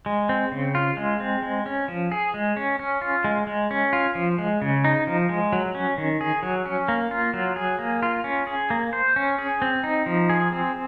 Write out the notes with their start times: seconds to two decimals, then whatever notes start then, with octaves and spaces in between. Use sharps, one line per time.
0.06 G#3
0.29 C4
0.52 C#3
0.75 F4
0.97 G#3
1.20 C4
1.42 G#3
1.66 C#4
1.88 F3
2.12 G#4
2.34 G#3
2.56 C#4
2.79 C#4
3.01 F4
3.24 G#3
3.47 G#3
3.71 C#4
3.93 F4
4.15 F3
4.38 G#3
4.62 C#3
4.84 D#4
5.07 F3
5.29 G#3
5.52 F#3
5.75 C#4
5.98 D#3
6.21 G#4
6.43 F#3
6.66 C#4
6.88 A#3
7.11 F4
7.34 F#3
7.56 G#4
7.79 A#3
8.03 F4
8.24 C#4
8.47 G#4
8.70 A#3
8.93 C5
9.16 C#4
9.39 G#4
9.62 C4
9.84 D#4
10.06 F3
10.29 G#4
10.52 C4